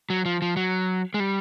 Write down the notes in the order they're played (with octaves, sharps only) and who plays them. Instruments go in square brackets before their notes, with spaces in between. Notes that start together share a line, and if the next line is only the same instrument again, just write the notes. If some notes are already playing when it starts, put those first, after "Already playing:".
[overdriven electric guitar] F#3
F3
F3
F#3
G#3
G3